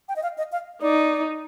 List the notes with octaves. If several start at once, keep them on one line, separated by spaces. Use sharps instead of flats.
G5
D#5
F5
D#5
F5
D#4 D5